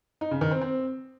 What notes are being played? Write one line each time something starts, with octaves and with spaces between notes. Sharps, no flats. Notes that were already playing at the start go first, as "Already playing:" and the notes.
D#4
C#3
D#3
C4
C4